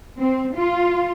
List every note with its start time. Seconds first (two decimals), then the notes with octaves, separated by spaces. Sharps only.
0.18 C4
0.57 F4